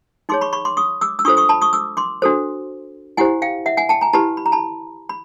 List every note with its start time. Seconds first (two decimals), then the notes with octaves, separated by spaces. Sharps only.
0.29 D#4 G#4 C#5 C6 D6
0.41 B5 C#6
0.53 B5 C#6
0.65 C6 D6
0.77 C#6 D#6
1.01 D6 E6
1.19 E6
1.25 D4 F4 A4 C5 C#6 D#6
1.37 C#6 D#6
1.49 A5 B5
1.62 C#6 D#6
1.73 D6 E6
1.97 C6 D6
2.22 D4 F#4 A4 C5
3.17 E4 G4 C5 F#5 G#5
3.42 F5 G5
3.66 E5 F#5
3.77 F#5 G#5
3.89 G5 A5
4.01 G#5 A#5
4.13 E4 G4 B4 A5 B5
4.37 B5
4.46 A#5
4.52 A5 B5
5.09 B5